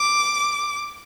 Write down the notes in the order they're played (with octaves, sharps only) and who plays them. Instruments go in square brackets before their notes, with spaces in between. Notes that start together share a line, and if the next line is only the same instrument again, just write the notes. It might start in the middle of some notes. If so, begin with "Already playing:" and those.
Already playing: [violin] D6